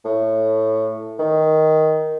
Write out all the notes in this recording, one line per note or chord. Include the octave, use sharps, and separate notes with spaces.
A2
D#3